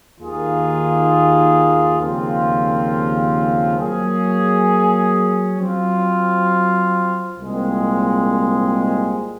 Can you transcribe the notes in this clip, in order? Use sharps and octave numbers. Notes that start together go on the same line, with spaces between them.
D#2 D#3 A#3 F4 G#4
D#2 C#3 F3 C4 F4
F#3 A#3 C#4 G#4
F#3 C4 F4
C2 A#2 G#3 C4